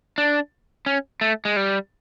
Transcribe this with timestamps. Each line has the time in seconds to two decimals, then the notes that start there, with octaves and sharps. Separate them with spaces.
0.18 D4
0.86 C#4
1.21 A3
1.45 G#3
1.56 G3